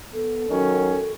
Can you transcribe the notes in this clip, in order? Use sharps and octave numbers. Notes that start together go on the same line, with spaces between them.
B3 A4
D#3 F#3 C#4